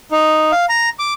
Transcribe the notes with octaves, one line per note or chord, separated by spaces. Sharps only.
D#4
F5
A#5
D6